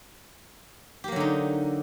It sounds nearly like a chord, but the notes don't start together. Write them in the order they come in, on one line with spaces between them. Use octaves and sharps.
G4 A#3 F#3 D3 D#4